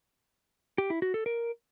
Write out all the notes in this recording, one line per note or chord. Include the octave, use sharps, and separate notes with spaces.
G4
E4
F#4
A4
A#4